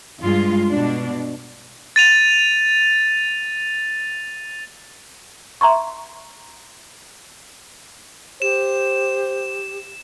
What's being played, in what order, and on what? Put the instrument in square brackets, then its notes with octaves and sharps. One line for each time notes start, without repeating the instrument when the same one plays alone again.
[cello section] G2 G#3 F4
B2 D4
[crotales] A6 D#7 F7
[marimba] E5 A#5 C6 C#6
[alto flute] G4 [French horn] C5 [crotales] E7